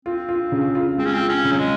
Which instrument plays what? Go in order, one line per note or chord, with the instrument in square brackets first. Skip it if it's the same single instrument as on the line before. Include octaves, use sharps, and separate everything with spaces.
[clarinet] C4 [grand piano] F4
[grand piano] F4
C#3
F4
[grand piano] G#3 [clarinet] C4
[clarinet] C#4
C4
[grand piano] F4
[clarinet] C#4
[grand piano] C#3
[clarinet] F#3
G#3